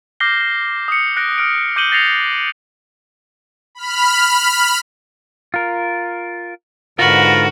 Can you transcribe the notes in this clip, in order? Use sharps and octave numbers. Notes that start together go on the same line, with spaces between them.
D6 F6 G6 A#6 C7 G7
D#6 C#7
F#6 A#6 D7
F6 D7
D6 G6 C#7 D#7 F#7 G7
G6 A6 A#6 C7 C#7 F7
B5 F6
F4 A#4
G#2 D3 F4 F#4 A#4 B4